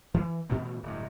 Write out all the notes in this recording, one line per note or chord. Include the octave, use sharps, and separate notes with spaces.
E3
A#2 C#3 E3 A3
D1 G2